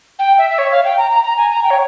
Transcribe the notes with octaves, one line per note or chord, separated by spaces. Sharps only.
G5
E5
E5
C#5
F5
G5
A#5
A#5
A#5
G#5
A#5
G5
C#5